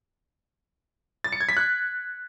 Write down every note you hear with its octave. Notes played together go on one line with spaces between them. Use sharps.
A6
C#7
G#6
B6
F#6